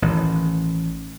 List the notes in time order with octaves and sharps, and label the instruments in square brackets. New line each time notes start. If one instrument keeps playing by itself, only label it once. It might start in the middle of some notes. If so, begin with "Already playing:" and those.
[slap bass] A1 D#3